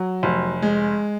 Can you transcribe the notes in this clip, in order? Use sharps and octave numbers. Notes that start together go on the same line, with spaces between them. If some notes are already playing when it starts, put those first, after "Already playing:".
Already playing: F#3
F1
G#3